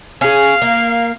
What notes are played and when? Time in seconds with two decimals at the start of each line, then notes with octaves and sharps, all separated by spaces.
0.21 C#4 G#4 F5
0.62 A#3